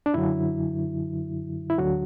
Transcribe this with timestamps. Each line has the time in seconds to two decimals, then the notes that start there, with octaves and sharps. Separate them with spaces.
0.06 D4
0.14 F#2 D3 F#3 E4
1.70 E4
1.78 D2 D3 F#3 F#4